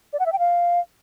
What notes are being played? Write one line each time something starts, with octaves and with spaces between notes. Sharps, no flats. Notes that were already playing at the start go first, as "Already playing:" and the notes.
D5
F#5
E5
G5
F5